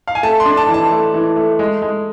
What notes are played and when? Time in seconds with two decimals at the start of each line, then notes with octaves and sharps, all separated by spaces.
0.08 F5
0.15 G#5
0.23 A3 A5
0.40 C6
0.46 D4
0.57 A5
0.68 E3
0.74 A5
0.91 A3
1.14 E3
1.36 A3
1.59 G#3
1.82 G#3